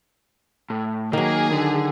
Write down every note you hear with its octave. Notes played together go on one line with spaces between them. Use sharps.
A2
D#3 F#3 A#3 G#4
D3